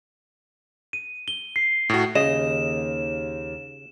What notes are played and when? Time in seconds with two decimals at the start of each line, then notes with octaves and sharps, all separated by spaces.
0.93 D#7
1.28 G7
1.56 C7
1.90 A2 F#4
2.15 D#2 C#3 D#5 E7